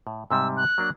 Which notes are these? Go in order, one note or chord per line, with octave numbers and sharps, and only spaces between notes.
A2
G#2 C3 G3 E6
F#6
F#3 A#3 D4